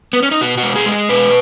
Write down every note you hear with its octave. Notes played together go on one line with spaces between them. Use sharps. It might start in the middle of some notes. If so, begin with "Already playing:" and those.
B3
C#4
D#4
B2 F#4
F#4
G#3
G#4
G#3
G#4
B2 B4